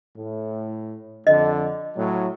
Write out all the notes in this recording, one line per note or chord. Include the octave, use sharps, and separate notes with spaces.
A2
F2 D3 D#5
A2 F#3